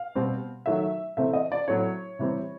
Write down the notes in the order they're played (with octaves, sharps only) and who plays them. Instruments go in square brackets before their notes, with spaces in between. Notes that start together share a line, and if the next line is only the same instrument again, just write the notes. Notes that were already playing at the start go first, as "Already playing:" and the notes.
Already playing: [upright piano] F5
B2 G3 C4
D#3 F#3 A3 E5
C3 E3 A3 C4 E5
D#5
D5
A2 F#3 A3 C4 C#5
C3 E3 G3 C4